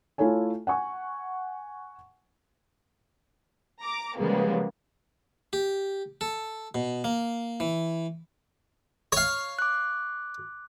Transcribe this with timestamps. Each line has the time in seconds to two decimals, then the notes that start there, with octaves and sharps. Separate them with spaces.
0.18 A3 E4 F4 A4 C#5 G#5
0.67 F#5 G#5 C#6
3.81 A#5 D6
4.17 C#3 F3 G3 G#3 A#3 B3
5.53 G4
6.21 A4
6.75 B2
7.04 A#3
7.60 E3
9.12 C#5 F5
9.59 D6 F#6